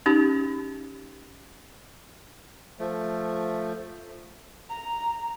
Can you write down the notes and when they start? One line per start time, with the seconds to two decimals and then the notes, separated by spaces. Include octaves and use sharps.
0.06 C#4 D#4 G4
2.80 F3 A3
4.70 A#5